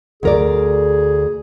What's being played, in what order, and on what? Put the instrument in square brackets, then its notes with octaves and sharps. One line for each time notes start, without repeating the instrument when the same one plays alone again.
[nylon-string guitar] D2 A#4 D5 [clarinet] G#4